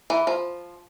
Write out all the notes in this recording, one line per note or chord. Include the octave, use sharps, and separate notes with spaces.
E3
F3